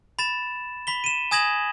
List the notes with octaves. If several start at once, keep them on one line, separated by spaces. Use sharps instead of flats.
B5 A6 E7
B5 B6 G7
D#7 E7
G#5 D#6 G#6 A#6 E7 F#7